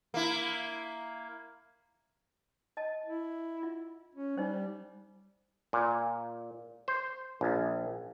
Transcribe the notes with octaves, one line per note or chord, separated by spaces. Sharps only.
A#3 E4
D#5 A5
E4
F4
C#4
G3 D#4 C5
A#2
C5
A#1